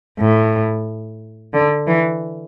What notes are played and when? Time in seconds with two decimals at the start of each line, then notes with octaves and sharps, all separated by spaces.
0.20 A2
1.54 D3
1.87 E3